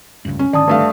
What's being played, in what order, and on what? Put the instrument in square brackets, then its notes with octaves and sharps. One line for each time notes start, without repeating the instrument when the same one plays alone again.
[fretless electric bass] F1 C#2 G2
[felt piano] C#4
[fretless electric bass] G#1 D3 D#3 [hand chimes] D5 A5 D#6
[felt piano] G2 A3 F5